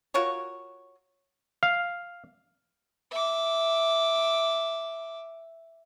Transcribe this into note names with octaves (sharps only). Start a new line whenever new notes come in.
F4 F#4 A#4 C#5
F5
E5 D6